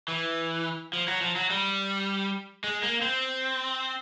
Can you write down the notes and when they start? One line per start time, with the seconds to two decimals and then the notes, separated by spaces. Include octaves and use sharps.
0.08 E3
0.93 F3
1.08 F#3
1.21 F3
1.36 F#3
1.50 G3
2.64 G#3
2.83 A#3
3.01 C4